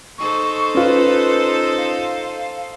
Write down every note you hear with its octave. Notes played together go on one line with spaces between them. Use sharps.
D#4 A4 C5 C#6
C#4 F4 B4
F5